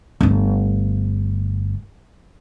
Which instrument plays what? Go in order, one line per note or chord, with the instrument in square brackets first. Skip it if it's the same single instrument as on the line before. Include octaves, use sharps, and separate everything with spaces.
[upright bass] G1 A3